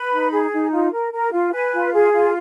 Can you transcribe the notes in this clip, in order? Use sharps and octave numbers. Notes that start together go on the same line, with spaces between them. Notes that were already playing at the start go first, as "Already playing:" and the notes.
Already playing: B4 B5
D#4
G#4
D#4
F4
A#4
A#4
F4
B4 G#5
F4
G#4
F4